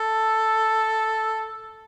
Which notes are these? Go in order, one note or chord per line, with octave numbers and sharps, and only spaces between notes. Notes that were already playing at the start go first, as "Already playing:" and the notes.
Already playing: A4